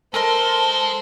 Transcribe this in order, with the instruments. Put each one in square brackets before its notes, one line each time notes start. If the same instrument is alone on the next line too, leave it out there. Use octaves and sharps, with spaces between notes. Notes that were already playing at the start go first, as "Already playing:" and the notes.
[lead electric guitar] G#3 C6 [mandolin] A4 A#4 D#5 [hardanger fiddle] C5 [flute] A5